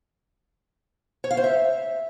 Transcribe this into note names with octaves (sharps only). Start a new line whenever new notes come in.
C#5
F5
C5
E5